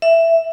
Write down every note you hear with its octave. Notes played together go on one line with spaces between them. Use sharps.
E5